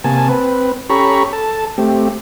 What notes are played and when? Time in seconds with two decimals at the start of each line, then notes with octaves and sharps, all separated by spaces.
0.04 C3 A#3 G#5 A5
0.29 C4 B4
0.90 C#4 G4 A4 A#5 B5 C#6
1.33 A4 A5
1.78 A3 C4 G4